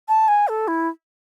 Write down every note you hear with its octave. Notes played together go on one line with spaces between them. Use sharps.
A5
G#5
A4
E4